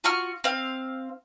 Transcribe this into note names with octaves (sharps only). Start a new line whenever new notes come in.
F4 F#4 C#6 F6
C4 F5